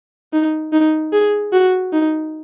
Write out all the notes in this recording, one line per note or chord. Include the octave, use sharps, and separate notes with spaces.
D#4
D#4
G#4
F#4
D#4